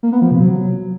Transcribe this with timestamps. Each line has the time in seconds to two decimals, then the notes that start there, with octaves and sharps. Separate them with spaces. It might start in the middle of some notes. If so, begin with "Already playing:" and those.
0.03 A#3
0.12 B3
0.22 F3
0.31 C3
0.40 F#3